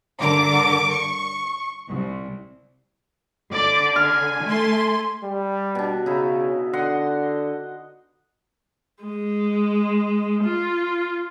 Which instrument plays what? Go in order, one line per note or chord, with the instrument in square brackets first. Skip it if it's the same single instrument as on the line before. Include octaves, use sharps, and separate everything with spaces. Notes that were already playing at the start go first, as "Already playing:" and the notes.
[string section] G2 D3 A#4 D6
C#6
C2
[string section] D3 [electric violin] D5 D6
[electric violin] G#5 [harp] F6
[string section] A3 A4 C6
[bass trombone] G3
[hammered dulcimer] B2 D4
[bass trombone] C#3 [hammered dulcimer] D#4 E4
[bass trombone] D3 [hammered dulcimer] D#5 F#5 C6
[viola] G#3
F4